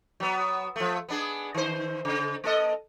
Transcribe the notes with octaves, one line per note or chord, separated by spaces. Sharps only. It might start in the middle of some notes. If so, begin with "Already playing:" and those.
F#3 B3
F3 A3
B3 D4 G#4
D#3 C5
C#3
A#3 A4 D#5